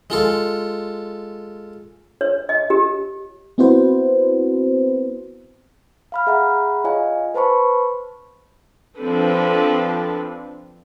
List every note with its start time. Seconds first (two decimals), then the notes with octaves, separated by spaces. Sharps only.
0.10 G#3 F4 A4
2.21 C#5
2.49 D#5
2.70 G4
3.58 B3 C4 E4 F#4 B4 C5
6.12 F5 B5 F6
6.27 G#4 E5 F#5 A#5 B5
6.84 F4 C#5 D#5 F5 G#5
7.35 B4 C5 A5 B5 C#6
8.98 F3 C4 D4 A4 B4